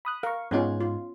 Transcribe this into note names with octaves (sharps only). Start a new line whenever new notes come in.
B5 D#6 F#6
A#4 F5 C#6
G#2 G#3 B3 C#4 D#4 F4
F4